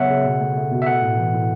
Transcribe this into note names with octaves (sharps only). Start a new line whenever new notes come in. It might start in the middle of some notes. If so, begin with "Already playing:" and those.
Already playing: C#3 F#3 B3 C#5 E5 F#5
C#3
B2
A3
A3
B2
E5
A3 F#5
A2
E3
A2